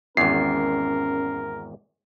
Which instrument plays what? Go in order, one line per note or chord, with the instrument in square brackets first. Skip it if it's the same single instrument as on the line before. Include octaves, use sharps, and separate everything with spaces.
[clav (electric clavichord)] G#1 E2 [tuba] C#4 [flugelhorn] A#4 [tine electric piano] C7